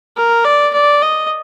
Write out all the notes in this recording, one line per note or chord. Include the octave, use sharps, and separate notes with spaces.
A#4
D5
D5
D#5